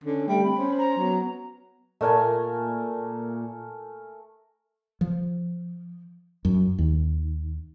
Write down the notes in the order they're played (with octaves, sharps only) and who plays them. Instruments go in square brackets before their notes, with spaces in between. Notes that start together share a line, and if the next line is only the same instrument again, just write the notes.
[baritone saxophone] D3 [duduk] C#4
[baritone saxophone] G3 [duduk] A3 [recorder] G5
[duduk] C4 [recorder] B5
[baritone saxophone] C#4 [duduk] C5
[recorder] A#5
[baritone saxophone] F#3 [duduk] B3
[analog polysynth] A#2 [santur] A3 A#4 G#5
[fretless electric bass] F3
F#2
D#2